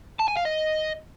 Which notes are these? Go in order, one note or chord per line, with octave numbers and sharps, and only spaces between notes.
A5
G#5
F5
D#5